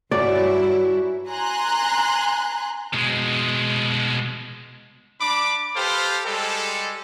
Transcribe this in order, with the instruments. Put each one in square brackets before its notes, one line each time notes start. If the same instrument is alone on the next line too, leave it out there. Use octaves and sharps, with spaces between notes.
[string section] G2 E4 [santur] F#3 C#4 F#4 [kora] D5
[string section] G#5 A#5 C6 F#6
[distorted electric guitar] B2 G#3
[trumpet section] D4 B5 D6
G4 A4 B4 C5 F5
G3 G#3 A4